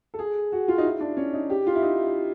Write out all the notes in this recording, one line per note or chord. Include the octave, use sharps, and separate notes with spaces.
A4
G#4
F#4
F4
D#4
E4
D4
C#4
D#4
G4
F4
E4
D#4